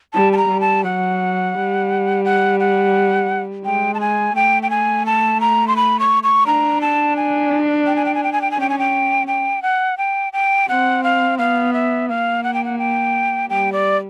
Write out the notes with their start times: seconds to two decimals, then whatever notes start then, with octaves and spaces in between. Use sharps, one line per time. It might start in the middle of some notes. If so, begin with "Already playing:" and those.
0.14 G3 A5
0.33 A5
0.37 A#5
0.49 G3
0.61 A5
0.84 F#3 F#5
1.55 G3
2.25 F#5
2.60 F#5
3.65 G#3 G5
3.94 A5
4.00 G#5
4.36 A3 G5
4.63 G5
4.70 G#5
5.06 A5
5.41 A#5
5.68 C6
5.76 B5
5.99 C#6
6.23 C#6
6.46 D4 A#5
6.81 A5
7.16 G#5
7.87 G5
7.96 G#5
8.05 G5
8.15 G#5
8.24 G5
8.33 G#5
8.42 G5
8.51 G#5
8.57 C#4 G5
8.69 G#5
8.79 G5
9.27 G5
9.62 F#5
9.98 G5
10.33 G5
10.69 C4 F#5
11.04 F5
11.38 B3 F5
11.73 E5
12.09 A#3 F5
12.44 F#5
12.54 G5
12.65 F#5
12.79 G5
13.49 G3 G5
13.73 D5